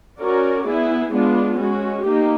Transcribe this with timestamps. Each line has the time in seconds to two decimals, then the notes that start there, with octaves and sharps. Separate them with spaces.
0.19 C#4 F#4 A#4 D5
0.66 B3 E4 G#4
1.12 G#3 B3 D4 F4
1.59 G#3 C#4 F#4
2.05 A#3 D#4 G4